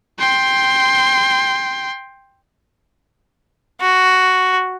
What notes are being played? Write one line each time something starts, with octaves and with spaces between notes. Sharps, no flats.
G5 C6
F#4